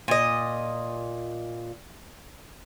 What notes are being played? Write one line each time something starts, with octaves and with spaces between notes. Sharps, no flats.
A#2 D#5